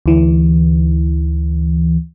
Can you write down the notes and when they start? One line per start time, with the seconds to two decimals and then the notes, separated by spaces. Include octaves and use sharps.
0.06 D2 E3